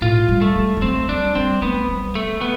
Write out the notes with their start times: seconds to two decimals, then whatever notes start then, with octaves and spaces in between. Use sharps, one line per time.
0.01 A2 F4
0.28 G3
0.42 A3
0.55 G3
0.77 G3
0.82 A3 C4
1.08 G3 D4
1.35 G3 C4
1.62 A3 B3
1.88 G3
2.15 A3
2.41 B3